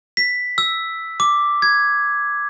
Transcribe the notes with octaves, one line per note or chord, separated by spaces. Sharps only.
B6
E6
D6
G#6